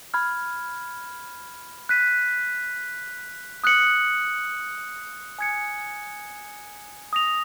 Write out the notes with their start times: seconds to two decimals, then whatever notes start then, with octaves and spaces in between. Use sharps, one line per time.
0.14 B5 F6 G#6
1.89 F#6 B6 D#7
3.64 D#6 F#6 C#7 F#7
5.39 G#5 D#6 G#6 C#7
7.13 D#6 A#6 F7